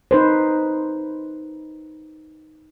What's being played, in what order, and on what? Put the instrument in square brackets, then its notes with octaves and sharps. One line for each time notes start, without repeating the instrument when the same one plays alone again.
[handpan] D#4 B4 C5